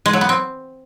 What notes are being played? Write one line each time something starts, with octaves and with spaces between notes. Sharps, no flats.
G#3
F#3
B3
C4